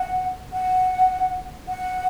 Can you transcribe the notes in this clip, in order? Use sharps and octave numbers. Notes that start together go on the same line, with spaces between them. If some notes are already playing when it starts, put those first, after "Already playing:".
Already playing: F#5
F#5
F#5